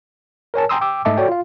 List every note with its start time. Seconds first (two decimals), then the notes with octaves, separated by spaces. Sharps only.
0.54 A#4 C#5 G#5 A5
0.69 G5 G#5 A#5 C6 D#6 E6
0.81 G5 D6 E6
1.05 G#2 A3 D#5 E5 A5 D6
1.17 F#4 A4 C#5 D5 G5
1.29 F4 F5